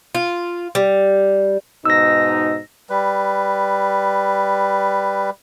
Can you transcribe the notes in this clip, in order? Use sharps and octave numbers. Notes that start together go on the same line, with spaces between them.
F4
G3
G#2 B2 D#4 E6 A#6
G3 B4